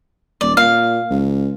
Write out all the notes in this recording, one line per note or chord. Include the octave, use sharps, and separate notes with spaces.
D#1 D5
A#2 F5
C#2